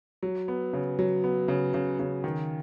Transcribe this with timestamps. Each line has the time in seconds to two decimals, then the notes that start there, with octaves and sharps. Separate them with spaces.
0.23 F#3
0.48 B3
0.73 C#3
0.99 F#3
1.24 B3
1.48 C#3
1.74 C#3
1.99 C#3
2.24 D#3